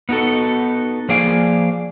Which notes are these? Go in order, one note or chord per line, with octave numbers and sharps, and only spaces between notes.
B3 D#4 F#4 A4
F3 A#3 G#4 D5 F5 G#5